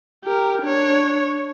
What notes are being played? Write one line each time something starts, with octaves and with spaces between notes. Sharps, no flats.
G4 A#4
D4 C#5